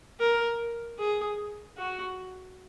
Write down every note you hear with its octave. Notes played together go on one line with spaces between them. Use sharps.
A#4
G#4
F#4